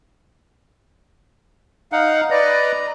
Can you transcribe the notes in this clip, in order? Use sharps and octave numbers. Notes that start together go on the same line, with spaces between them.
D#4 F5 F#5
B4 D5 D#5 A#5